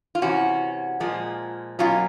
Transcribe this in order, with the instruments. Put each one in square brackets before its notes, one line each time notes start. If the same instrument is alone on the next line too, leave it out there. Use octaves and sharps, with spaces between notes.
[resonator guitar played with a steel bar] F4
C3 E3 C#4 F#4
A#2 F3 G#3
B2 F#3 A#3 C#4 F4